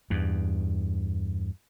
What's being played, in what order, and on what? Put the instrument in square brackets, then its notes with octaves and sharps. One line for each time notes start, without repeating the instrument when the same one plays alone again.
[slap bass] E2 G2